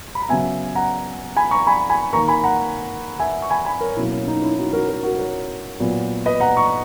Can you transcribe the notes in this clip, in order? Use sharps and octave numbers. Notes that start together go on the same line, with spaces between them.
B5
A#5
C#3 F#3 B3 E5 G#5
F#5 A#5
G#5 B5
A#5 C#6
G#5 B5
G#5 B5
D#3 A#3 A#5 C#6
G#5 B5
F#5 A#5
E5 G#5
C#6
G#5 B5
G#5 B5
A#4 C#5
B2 F#3 A#3 C#4 E4
C#4
D#4
C#4 E4
D#4 F#4
F#4 A#4
F#4 A#4
F#4 A#4
A#4 C#5
A#2 F#3 B3
B4 D#5
F#5 A#5
A#5 C#6